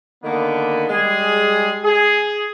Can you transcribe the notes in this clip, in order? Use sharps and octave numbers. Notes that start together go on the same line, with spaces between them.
D3 D#3 A#3 B3
G3 G#3 G#4
G#4